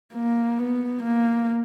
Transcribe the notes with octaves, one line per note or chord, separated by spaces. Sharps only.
A#3
B3
A#3